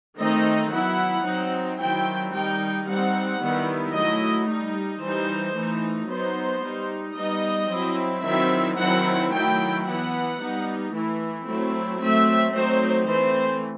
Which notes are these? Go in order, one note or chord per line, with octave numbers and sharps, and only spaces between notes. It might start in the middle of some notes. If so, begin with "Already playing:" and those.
D#3 A3 C4 D#4 D#5
F#3 B3 E4 F#5
F#3 C4 D#4
D#3 F#3 C4 E4 G5
D#3 G3 D#4 G5
G3 C4 D#4 F#5
D#3 G3 B3 E4
F#3 A3 E4 D#5
G3 D#4
E3 G3 D#4 C5
E3 A3 D#4
F#3 B3 D#4 C5
G3 D#4
G3 B3 D#4 D#5
F#3 C4 E4
D#3 F#3 C4 E4 E5
D#3 F#3 C4 E4 F#5
D#3 F#3 A3 E4 G5
E3 B3 E4 F#5
G3 B3 D#4
E3 A3 E4
F#3 A3 C4 E4
F#3 A3 C4 E5
F#3 A3 C4 D#4 C5
E3 A3 C4 C5